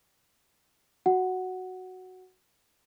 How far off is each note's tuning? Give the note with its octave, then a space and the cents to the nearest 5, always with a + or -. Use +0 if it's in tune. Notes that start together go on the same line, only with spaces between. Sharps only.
F#4 +0 F#5 +0